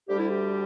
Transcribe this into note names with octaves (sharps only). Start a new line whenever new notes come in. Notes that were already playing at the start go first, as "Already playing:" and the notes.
D2 D3 G3 G4
E4
G4